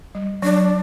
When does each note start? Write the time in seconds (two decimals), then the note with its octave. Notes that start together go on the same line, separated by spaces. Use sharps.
0.15 G3
0.42 F#3 D4